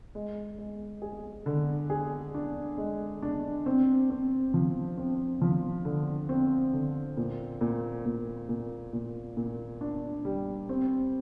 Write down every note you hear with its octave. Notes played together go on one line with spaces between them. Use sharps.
G#3
G#3
G#4
D3
G#4
D4
G#3
D4
C4
C4
F3
C4
F3
D3
C4
D3
A#2
A#2
A#2
A#2
A#2
A#2
D4
G3
C4